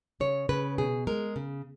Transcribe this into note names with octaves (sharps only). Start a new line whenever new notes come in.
C#3 C#5
C#3 B4
B2 G#4
G#3 A#4
C#3